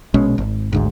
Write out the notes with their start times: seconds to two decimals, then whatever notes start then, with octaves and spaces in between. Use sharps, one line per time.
0.14 A#1 B2 G#3 C#4
0.38 G#1
0.73 G#1 D2 G#2